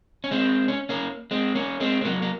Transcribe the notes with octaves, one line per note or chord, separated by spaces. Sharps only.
C#4
G#3 C4
C#4
A#3 C#4
G#3 C4
A#3 C#4
G#3 C4
C4
F#3 A#3
A#3